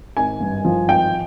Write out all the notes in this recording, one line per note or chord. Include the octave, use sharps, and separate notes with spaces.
G#1 G#5
G2
F3
G#1 G5